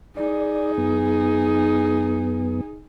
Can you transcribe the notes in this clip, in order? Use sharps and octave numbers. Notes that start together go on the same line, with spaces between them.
D#4 G#4 D5
F#2 B3